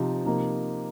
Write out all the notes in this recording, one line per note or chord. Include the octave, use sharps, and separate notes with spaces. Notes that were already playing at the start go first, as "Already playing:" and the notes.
Already playing: C3 F3 D#4
C3 F3 A#3 D#4